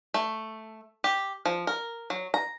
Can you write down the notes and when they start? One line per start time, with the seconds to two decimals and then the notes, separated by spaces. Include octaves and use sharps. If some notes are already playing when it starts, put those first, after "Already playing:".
0.14 A3
1.04 G4
1.45 F3
1.67 A#4
2.10 F#3
2.34 A#5